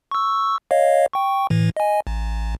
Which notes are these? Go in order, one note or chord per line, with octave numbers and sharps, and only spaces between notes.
C#6 E6
C#5 D#5 F5
G5 C#6
A2 E3
D#5 G#5
A1